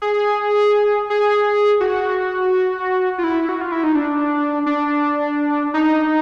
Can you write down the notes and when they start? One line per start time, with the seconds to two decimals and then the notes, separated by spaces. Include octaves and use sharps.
0.02 G#4
1.10 G#4
1.80 F#4
3.18 F4
3.24 E4
3.49 F#4
3.61 F4
3.72 E4
3.84 D#4
3.95 D4
4.66 D4
5.74 D#4